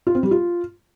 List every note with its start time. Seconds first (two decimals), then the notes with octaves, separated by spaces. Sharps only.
0.07 F4
0.15 C4
0.23 G3
0.31 F4